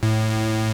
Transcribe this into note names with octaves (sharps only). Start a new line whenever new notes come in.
A2